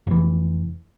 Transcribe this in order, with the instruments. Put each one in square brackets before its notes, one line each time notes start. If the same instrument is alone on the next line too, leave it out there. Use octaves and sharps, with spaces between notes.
[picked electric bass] F1 E3